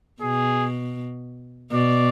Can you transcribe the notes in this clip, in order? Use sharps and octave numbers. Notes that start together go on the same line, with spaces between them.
B2 G#4
B2 D5